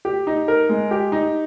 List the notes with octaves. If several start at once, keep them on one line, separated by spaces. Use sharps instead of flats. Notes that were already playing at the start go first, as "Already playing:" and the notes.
G4
D#4
A#4
G#3
G4
D#4